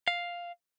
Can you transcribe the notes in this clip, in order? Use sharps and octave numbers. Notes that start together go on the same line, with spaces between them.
F5